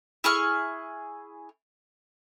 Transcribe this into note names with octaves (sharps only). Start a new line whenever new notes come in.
E4 G#4 C#6 F6